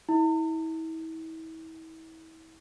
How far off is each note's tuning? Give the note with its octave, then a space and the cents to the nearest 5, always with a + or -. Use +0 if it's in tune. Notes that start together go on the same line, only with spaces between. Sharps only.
E4 -35